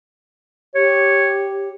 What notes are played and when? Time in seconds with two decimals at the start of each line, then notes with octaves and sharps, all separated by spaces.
0.75 G4 C#5